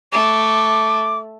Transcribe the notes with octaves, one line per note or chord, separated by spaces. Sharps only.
A3 D6